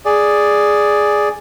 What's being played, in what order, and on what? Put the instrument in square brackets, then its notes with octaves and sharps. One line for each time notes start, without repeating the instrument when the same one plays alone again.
[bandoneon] G#4 D5